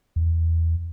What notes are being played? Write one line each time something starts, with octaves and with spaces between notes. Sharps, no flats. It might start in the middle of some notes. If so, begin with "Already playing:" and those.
E2